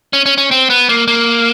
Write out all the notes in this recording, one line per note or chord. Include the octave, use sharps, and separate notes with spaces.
C#4
C#4
C#4
C4
B3
A#3
A#3